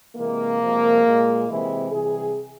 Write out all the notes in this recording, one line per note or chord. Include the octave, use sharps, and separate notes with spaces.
C3 E3 G#3 A#3
C3 F3 G#3
A#2 G#3
C3 E3 G#3 E4
C3 E3 G3 G#4